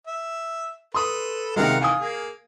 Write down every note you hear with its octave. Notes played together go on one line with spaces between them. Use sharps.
E5
A4 B4 C6 D#6
C3 D#3 G#3 A#4 F5 F#5
D#3 E3 F5 G#5 D#6
A#3 G#4